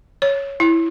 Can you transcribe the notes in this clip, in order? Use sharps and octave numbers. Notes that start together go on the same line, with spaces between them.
C#5
E4